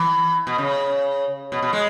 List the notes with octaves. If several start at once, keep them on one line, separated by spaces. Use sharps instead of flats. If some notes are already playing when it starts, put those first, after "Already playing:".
Already playing: E3
B2
C#3
B2
B2
G#3